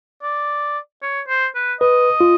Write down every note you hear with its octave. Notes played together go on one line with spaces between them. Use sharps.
D5
C#5
C5
B4
B4 D#5
F4